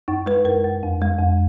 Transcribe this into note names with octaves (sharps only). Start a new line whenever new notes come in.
F#2 D#4
G#3 B4
F#2 A#4
F#2
F2
G#3
F2